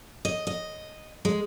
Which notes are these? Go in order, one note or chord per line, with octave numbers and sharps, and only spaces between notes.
D#5
D#5
G#3